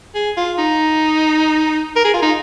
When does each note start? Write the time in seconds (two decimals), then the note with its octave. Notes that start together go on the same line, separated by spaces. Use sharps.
0.15 G#4
0.37 F4
0.58 D#4
1.96 A#4
2.04 G#4
2.14 F4
2.22 D#4